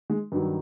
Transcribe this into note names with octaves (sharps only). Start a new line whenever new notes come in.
G#3
G2 D#3 F#3